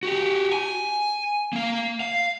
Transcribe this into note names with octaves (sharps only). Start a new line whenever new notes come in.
F#4 G4
G#5
A#3 F5
F5